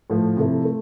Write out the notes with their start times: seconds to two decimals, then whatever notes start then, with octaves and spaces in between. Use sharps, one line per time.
0.10 A2 F3 A3
0.37 C3 F3 A3 E4
0.65 A3